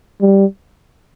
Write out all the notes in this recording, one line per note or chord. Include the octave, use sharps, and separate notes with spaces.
G3